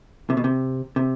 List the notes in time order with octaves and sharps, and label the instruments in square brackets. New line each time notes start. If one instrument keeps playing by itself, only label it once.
[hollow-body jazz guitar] C3
B2
C3
C3